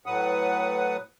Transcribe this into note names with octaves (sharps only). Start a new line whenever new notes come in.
A2 F#3 B4 F#5 D#6